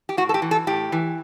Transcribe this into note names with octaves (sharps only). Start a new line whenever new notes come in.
G4
A2 F#4
A4
G4
E3
A4
A2 G4
E3